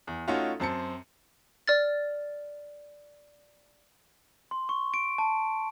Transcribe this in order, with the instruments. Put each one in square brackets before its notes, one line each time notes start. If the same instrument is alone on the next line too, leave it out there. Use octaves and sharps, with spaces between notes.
[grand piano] E2
A3 C#4 D#4 F4 F#4
F#2 C4 A5 C#7
[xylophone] D5 F6 A6
[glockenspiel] C6
C#6
D7
A5